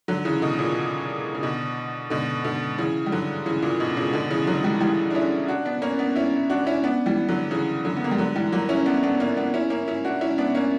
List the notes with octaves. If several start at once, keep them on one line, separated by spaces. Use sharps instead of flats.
D3 F#3
C#3 E3
B2 D3
A#2 C#3
C#3
B2 D3
B2 D3
B2 D3
C#3 E3
G3
D3 F#3
C#3 E3
A#2
B2
A#2 C#3
B2 D3
C#3 E3
D3 F#3
E3 G3
E3 G3
D4
C#4 E4
D4 F#4
B3 D4
A#3 C#4
B3 D4
C#4 E4
D4 F#4
C#4 E4
B3 D4
E3 G3
D3 F#3
C#3 E3
D3 F#3
B3
A#3
G3
D3 F#3
E3 G3
F#3 A#3
C#4 E4
B3 D4
B3 D4
A#3 C#4
B3 D4
C#4 E4
A#3 C#4
C#4 E4
D4 F#4
C#4 E4
B3 D4
A#3 C#4